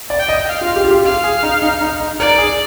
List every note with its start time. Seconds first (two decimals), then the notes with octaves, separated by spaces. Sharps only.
0.10 D5
0.19 G5
0.29 D#5
0.47 F5
0.61 F4
0.76 G4
0.84 F4
0.91 G4
1.04 F4 F5
1.24 G#4
1.43 D#4
1.62 D#4
1.81 D#4
2.00 D#4
2.20 A#4 D5
2.38 G#4